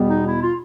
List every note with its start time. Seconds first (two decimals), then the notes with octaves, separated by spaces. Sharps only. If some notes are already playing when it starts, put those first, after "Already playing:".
Already playing: E2 B2 G3 B3
0.09 D#4
0.26 E4
0.42 F4